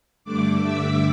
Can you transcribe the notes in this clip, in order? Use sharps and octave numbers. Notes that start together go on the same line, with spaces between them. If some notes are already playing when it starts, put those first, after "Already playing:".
G2 D3 A3 D4 D5 D6
E5 E6